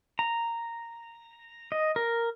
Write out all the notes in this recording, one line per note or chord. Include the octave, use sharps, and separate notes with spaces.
A#5
D#5
A#4